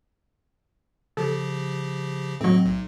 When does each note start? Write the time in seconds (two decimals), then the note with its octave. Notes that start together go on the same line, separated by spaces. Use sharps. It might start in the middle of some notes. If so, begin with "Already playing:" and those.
1.17 C#3 F3 G4 A4
2.41 A2 F#3 C4 D#5
2.65 B1